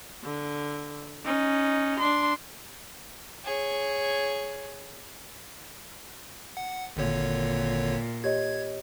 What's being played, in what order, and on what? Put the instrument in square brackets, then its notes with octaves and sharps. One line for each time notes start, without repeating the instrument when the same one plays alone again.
[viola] D3
C#4 D#4
D4 C6
[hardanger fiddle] G#4 C#5
[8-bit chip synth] F#5
[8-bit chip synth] G#1 D3 C#5 [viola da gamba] A#2
[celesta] G4 C#5 D#5 [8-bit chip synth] G#6